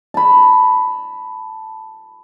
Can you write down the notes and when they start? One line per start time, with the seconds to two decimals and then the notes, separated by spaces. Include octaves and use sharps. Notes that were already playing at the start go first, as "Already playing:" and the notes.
0.14 A5 B5